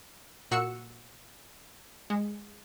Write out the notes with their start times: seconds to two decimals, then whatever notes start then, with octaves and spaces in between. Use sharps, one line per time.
0.51 A#2 F#4 F#5 E6 C#7
2.10 G#3